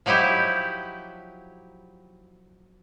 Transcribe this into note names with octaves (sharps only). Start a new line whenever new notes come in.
F3 F#3 D#4 E4 G4